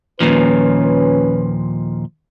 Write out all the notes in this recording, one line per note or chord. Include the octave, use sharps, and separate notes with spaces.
D#2 A#2 F3 C#4 B4